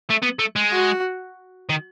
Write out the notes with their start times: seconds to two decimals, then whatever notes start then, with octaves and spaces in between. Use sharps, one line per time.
0.10 A3
0.22 B3
0.39 A3
0.56 G#3
0.72 F#4
1.70 D#3